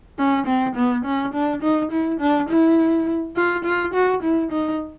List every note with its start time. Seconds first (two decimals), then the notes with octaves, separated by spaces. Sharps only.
0.19 C#4
0.47 C4
0.76 B3
1.05 C#4
1.34 D4
1.62 D#4
1.92 E4
2.20 D4
2.49 E4
3.36 F4
3.65 F4
3.94 F#4
4.23 E4
4.51 D#4